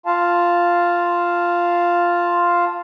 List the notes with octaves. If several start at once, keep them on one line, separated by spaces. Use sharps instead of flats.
F4 F5 A5